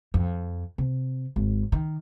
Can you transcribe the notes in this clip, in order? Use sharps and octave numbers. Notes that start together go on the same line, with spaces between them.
F2
C3
G#1
D#3